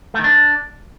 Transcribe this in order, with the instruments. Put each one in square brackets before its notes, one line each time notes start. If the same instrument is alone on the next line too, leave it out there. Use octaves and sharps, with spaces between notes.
[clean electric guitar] A3
D#3
D4